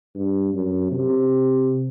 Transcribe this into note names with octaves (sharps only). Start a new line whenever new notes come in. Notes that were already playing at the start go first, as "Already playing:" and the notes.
G2
F#2
C3